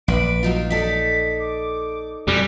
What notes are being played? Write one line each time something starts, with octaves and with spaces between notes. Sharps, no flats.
A#1 D4 B4 D7
F#3 D#4 F4
D#4 A4 D5 B6
D6
F2 B2 G3 G#5